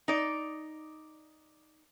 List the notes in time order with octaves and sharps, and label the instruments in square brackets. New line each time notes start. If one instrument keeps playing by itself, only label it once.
[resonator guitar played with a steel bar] D#4 D5